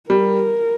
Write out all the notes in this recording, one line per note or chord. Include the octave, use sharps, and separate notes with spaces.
G3 A#4